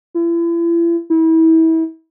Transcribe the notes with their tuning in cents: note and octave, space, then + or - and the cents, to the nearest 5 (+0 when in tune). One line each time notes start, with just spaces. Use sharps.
E4 +40
E4 -30